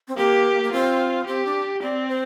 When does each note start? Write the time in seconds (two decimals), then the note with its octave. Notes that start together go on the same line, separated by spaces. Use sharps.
0.08 C4
0.17 A#3 G4
0.63 A#3
0.72 C4 F4
1.27 C4 G4
1.45 D4
1.82 C4 D5
2.08 C5